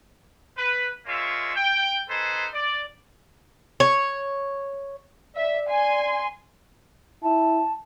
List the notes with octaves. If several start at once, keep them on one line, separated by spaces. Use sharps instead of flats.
B4
G#3 A#3 F4 C#5 E5
G5
D#4 G#4 A4 B4 C5
D5
C#5
D5 E5
G#5 C6
E4 A5